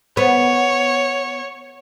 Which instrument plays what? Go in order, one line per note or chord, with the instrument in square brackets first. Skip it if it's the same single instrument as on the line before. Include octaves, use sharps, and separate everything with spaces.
[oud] B3 [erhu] C#5